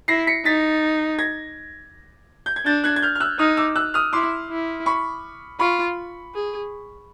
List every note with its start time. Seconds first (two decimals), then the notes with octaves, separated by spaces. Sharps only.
0.08 E4 A#6 C7
0.27 B6 C#7
0.45 D#4 A6 B6
1.19 G#6 A#6
2.46 G6
2.56 G#6
2.66 D4 G6 A6
2.84 F#6 G#6
2.96 G#6
3.02 F6 G6
3.15 F6
3.20 E6 F#6
3.39 D#4 D#6 F6
3.57 D6 E6
3.76 E6 F#6
3.94 D#6 F6
4.13 E4 C6 D6
4.50 E4
4.86 B5 C#6
5.59 F4 B5 C#6
6.34 G#4